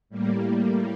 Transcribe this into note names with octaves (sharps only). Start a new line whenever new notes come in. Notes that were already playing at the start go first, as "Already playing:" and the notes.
A2 G3 A#3